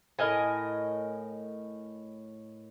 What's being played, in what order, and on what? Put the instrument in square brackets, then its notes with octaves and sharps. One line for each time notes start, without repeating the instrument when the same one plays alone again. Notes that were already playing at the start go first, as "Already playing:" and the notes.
[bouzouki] A2 A#4 D#5 G#5